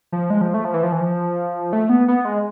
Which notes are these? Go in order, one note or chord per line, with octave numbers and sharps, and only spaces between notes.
F3
G#3
F3
A3
F3
E3
F3
E3
F3
A3
B3
B3
G#3